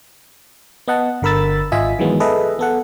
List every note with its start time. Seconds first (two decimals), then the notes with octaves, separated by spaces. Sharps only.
0.87 B3 D#5 F#5 A5
1.22 G1 D3 A#4 B5 E6 A6
1.72 G#1 F4 D#5 E5 G#5 B6
1.99 D#3 E3 F#3 G#3 B3
2.20 G#4 A4 B4 D#5 E5
2.59 B3 A4 F#5